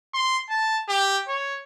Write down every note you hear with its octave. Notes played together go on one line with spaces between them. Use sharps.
C6
A5
G4
C#5